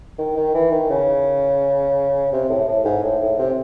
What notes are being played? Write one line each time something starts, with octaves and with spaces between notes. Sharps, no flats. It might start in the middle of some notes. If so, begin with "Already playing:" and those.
D#3
D#3
E3
D#3
C#3
C3
A2
A2
G#2
A2
A2
C3